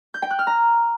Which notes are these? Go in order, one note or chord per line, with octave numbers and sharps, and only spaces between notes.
G6
G5
F#6
F6
A#5